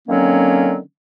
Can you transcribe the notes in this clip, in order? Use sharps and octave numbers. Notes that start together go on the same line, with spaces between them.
D3 D#3 F#3 A#3 C4 C#4